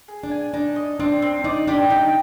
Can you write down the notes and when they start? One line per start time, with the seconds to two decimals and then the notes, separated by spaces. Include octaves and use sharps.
0.08 G#4
0.23 D4
0.31 G#5
0.54 D4 D#4
0.76 D#5
1.00 C4 D4
1.22 C4
1.44 D#4 D5
1.67 D4 G4
1.90 D#4 G5